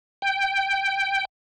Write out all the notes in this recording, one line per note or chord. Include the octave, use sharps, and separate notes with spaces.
G5